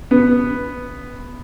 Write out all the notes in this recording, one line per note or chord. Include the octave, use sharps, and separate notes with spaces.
B3